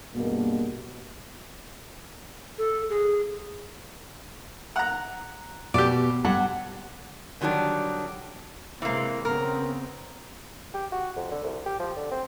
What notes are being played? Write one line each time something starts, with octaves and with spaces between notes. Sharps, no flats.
G2 B2 G#3 A#3
A4
G#4
F#5 A#5
B2 G4 D5
G2 F#5
D3 D#3 F#3 G3 D4
C3 E3 G#3 A#3 C4
C#3 B3 C4 A#4
G4
F#4
F2
D3
C2
G4
F3
D3
C4